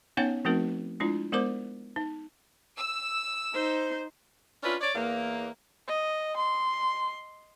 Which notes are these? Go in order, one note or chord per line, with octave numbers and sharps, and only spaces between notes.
B3 C#4 D#4 C#5 F#5 G5
F3 A3 C4 D#4 F#4 A#4
G#3 D4 E4 F4
G#3 B3 A#4 C5 D6
D#4
E6
D#4 C5
C#4 D4 E4 F4 B4
C#5 D5
E2 A#3
D#5
C6